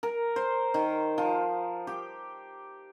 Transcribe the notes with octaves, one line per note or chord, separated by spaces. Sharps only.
A#4
C5
D#3
F3
G4